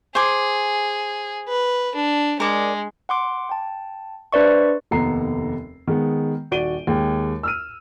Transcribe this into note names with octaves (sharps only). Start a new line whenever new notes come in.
G#4 C5 G#5 D6
B4
D4
G#3 A#4 D5
F#5 C6 D6
G5 A5
D4 B4 C5 D5 E5 C#6
F1 D#2 B3 A4 A#5 C7
D#3 G#3 B3
D#1 F#4 D5 D7 D#7 G7
D#2 G#3 G5
E6 F6 D#7